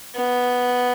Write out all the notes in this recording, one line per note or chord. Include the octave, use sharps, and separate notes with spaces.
B3